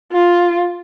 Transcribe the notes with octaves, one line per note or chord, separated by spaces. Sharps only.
F4